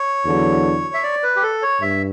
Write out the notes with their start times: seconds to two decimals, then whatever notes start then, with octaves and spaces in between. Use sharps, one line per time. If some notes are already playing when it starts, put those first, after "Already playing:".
Already playing: C#5
0.25 E2 D3 F#3
0.94 E5
1.03 D5
1.23 B4
1.36 G4
1.43 A4
1.62 C#5
1.82 G2 E5